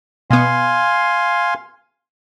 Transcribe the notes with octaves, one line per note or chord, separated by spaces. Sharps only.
B2 B3 F5 G#5 C6